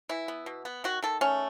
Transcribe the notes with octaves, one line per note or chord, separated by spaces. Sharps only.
E3 E4
B3
B2
B3
D#3 F#4
D#3 A4
A3 C#4